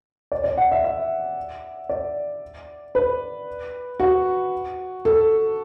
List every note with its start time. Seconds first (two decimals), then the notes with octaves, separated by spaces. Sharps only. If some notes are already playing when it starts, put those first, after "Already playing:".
0.32 D5
0.44 D5
0.58 F#5
0.72 E5
0.84 E5
1.89 D5
2.95 B4
4.00 F#4
5.05 A4